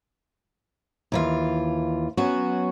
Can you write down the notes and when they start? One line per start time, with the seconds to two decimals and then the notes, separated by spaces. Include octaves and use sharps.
1.12 D#2 E3 F4
2.17 F#3 B3 C#4 F#4